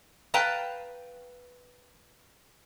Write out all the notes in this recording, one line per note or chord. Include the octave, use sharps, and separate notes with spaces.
B4 F5 G5 A5 A#5